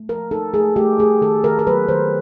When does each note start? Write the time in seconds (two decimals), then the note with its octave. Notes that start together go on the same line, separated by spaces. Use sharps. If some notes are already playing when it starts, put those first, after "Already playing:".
Already playing: A3
0.09 F3 A#4
0.31 D#4 A4
0.54 A3 G#4
0.76 A3 G4
0.99 A3 G#4
1.22 D#3 A4
1.44 D#3 A#4
1.59 A#4
1.67 F#3 B4
1.88 D#3 C5